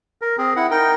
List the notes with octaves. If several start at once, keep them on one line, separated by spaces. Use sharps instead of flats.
A#4
C4 G#4
E4 F#5
D#4 A#4 G5